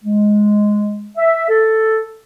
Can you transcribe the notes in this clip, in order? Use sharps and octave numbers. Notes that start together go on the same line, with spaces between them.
G#3
E5
A4